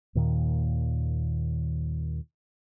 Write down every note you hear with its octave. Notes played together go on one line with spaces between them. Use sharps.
D#2 A#2 D#3